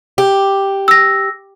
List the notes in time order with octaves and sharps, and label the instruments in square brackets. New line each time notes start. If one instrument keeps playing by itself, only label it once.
[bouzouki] G4
[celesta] E6 A#6